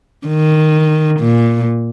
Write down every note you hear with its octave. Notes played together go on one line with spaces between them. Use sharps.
D#3
A#2